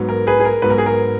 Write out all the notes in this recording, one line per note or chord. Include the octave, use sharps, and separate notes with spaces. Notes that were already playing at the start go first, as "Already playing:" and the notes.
Already playing: G#2 F#3 B3
A#4
G#4 B4
G#4
A#4
G#2 F#3 B3 B4
A#4
G#4
A#4